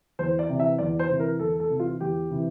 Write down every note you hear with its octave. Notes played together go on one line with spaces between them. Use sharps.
E2 C5
D5
C3 E3
E5
E2 D5
C5
C3 E3
A#4
E2 A4
A4
C3 E3
F4
E2 G4
C3 E3